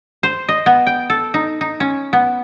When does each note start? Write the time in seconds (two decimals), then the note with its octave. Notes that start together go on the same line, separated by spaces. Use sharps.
0.23 C5
0.49 D#5
0.66 B3
0.87 G5
1.10 A4
1.34 D#4
1.61 D#4
1.80 C#4
2.13 B3